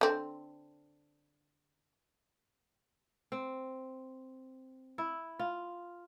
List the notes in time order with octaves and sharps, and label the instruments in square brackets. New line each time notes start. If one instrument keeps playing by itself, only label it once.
[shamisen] D3 C4
[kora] C4
E4
F4